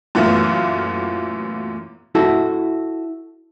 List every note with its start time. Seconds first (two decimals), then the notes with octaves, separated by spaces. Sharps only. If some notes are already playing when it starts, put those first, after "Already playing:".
0.15 F#2 A#2 E3 A3 B3 F4
2.15 E4 F#4 A4